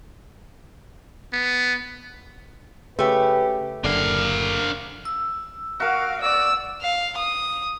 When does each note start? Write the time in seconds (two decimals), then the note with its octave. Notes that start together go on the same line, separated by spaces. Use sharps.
1.33 B3
2.99 C#3 A3 G4 B4
3.84 F#1 D3 D4 A#4 F5
5.05 E6
5.80 F#4 A#4 F5
6.22 D5 E6
6.82 F5
7.17 D#6